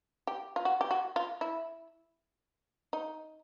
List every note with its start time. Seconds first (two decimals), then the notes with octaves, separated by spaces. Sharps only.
0.27 G4
0.56 F4
0.65 F#4
0.81 G4
0.91 F#4
1.16 F4
1.41 E4
2.93 D#4